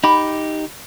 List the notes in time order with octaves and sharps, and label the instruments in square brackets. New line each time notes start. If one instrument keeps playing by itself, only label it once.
[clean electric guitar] D#4 G4 [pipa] B5